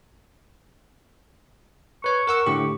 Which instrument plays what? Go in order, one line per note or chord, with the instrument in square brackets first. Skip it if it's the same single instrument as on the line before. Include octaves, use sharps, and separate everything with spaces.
[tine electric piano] B4 C#5 [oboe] C#6
[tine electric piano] A#4 F#5 E6
A2 D3 G4